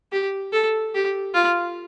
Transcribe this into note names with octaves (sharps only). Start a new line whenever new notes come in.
G4
A4
G4
F4